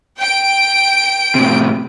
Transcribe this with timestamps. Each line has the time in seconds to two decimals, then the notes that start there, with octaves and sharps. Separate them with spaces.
0.17 G5 D7
1.35 A2 C3